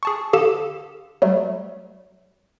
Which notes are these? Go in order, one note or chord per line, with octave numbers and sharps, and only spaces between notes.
G#4 A5 C#6
D3 G4 A4 F5 D#6 E7
F#3 G3 A3